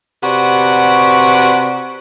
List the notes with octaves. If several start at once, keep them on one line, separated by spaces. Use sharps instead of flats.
C3 F#4 B4 D5 F#5